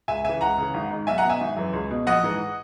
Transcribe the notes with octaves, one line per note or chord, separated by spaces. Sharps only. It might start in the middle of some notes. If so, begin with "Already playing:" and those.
C#2 E5 G#5
C#3 E3 E5 G#5
C#2 F#5 A#5
C#3 E3
G#1
G#2 D#3
B1 E5 G#5
F#5 A#5
B2
E5 G#5
G#1
F#2 E3
C#2
B2
A#1 D#5 F#5
G#2 E3